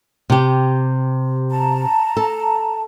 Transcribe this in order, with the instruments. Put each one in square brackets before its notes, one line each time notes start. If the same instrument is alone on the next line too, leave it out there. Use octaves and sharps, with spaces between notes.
[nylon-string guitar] C3 G4
[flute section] A5 A#5
[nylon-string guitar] A4